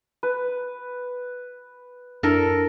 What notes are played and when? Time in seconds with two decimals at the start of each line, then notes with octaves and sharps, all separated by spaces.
0.23 B4
2.23 F#2 D4 E4 A4 A#4